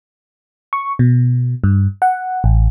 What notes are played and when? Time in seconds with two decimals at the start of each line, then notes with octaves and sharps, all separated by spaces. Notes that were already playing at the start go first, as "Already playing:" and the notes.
0.73 C#6
0.99 B2
1.64 G2
2.02 F#5
2.44 A1